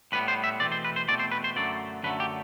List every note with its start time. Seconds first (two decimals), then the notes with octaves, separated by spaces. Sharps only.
0.12 A2 G3 B3 B4
0.28 C5
0.44 E5
0.60 E2 B2 A3 C4 D5
0.72 C5
0.85 B4
0.96 C5
1.08 E2 B2 A3 C4 D5
1.19 C5
1.32 B4
1.44 C5
1.56 F#2 D3 F#3 A3 D5
2.03 F#2 D3 F#3 A3 B4
2.20 G4